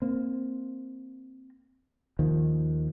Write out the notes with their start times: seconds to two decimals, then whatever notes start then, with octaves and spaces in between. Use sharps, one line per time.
0.02 A#3 C4
2.19 D#2 D#3 F3